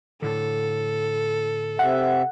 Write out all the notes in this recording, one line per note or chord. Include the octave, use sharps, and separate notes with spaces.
A2 D3 A4
C3 E5 F#5